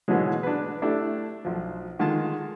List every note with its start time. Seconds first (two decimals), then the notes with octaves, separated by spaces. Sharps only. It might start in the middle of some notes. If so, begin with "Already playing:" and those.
0.08 G#2 B2 D3 E3 F#3 G#3
0.43 D4 B4
0.82 A3 D4 E4 G4 A4
1.45 B1 F3
1.99 D3 D#3 G#3 F4 A5 C6